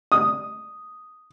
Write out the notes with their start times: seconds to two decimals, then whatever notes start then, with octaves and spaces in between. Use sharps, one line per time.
0.12 D#6